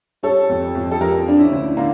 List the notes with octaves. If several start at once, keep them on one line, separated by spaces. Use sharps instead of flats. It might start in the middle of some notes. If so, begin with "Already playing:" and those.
G3 A4 C#5
F2
F2
A4
F3 G4 A#4
F3 D4
C#4 E4
D2
D3 A#3 D4